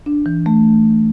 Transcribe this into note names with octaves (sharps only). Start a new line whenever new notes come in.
D4
E3
A3